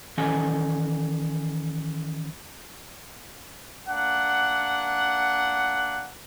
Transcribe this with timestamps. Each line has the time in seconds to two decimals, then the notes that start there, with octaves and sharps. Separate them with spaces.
0.17 D#3 E3 C#4 A4 D#5 G#5
3.89 A#3 D4 F#5